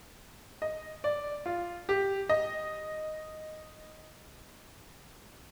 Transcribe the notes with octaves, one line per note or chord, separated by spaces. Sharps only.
D#5
D5
F4
G4
D#5